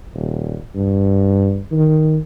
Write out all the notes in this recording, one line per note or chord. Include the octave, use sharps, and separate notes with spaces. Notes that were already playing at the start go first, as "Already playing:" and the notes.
D#1
G2
D#3